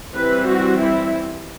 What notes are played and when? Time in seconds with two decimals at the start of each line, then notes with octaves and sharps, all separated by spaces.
0.14 E3 G3 C4 B4
0.47 F#4
0.80 E4